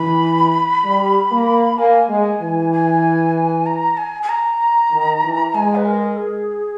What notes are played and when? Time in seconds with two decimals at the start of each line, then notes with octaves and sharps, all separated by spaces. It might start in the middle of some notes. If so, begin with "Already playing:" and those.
Already playing: E3 B5
0.84 G3
1.31 A#3
1.78 A#3 G#5
2.09 G#3
2.41 E3
2.72 G#5
3.66 A#5
3.97 G#5
4.23 G#5
4.29 A#5
4.92 D#3
5.23 E3
5.54 G#3 G#5
5.76 B4
5.86 A#4
6.17 G#4